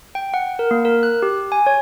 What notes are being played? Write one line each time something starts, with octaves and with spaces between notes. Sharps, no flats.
G5
F#5
A#4
A#3
A#4
F#6
G4
G#5
C#5